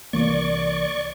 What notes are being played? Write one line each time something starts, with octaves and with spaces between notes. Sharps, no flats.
C2 E3 A#3 D5 C#6